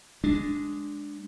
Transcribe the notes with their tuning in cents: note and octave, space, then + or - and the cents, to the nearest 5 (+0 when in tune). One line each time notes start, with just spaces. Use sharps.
G#3 +0 D4 +0